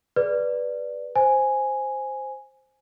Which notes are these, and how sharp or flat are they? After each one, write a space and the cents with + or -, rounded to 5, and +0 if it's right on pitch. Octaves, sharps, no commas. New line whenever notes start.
G#4 +15 B4 +0 D5 +0
C5 +0 G#5 +0